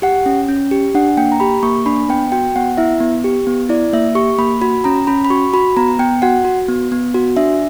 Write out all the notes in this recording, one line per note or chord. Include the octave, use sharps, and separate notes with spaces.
G4 F#5
C#4
C#4
G4
D4 F#5
A#3 G5
A#5
G4 B5
A#3 C#6
D4 B5
B3 G5
F#4 G5
B3 F#5
E4 E5
B3
G4
B3
E4 D5
A#3 E5
G4 C#6
A#3 B5
F#4 B5
C#4 A#5
C#4 B5
B5
F#4 C#6
F#4 B5
B3 A#5
B3 G5
F#4 F#5
F#4
B3
B3
F#4
D4 E5